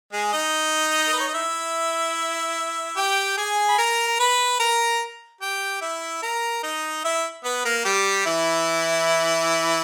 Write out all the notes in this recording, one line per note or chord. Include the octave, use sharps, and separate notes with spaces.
G#3 G#4
D#4 D#5
A#4
B4
C#5
D#5
E4 E5
G4 G5
G#4 G#5
B5
A#4 A#5
A#5
B4 B5
A#4 A#5
G4 G5
E4 E5
A#4 A#5
D#4 D#5
E4 E5
B3 B4
A#3 A#4
G3 G4
E3 E4